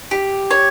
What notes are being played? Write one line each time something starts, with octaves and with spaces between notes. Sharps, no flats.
G4
C#5